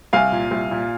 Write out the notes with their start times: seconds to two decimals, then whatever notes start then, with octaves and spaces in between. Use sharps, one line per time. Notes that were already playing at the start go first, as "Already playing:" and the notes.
0.13 C2 F5 G#5
0.32 A#2
0.51 C2
0.71 A#2